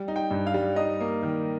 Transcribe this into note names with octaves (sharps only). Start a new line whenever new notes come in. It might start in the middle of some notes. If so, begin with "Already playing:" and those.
Already playing: G3
D#4
G5
G2
F5
G3
D#4 D#5
A#3
D#3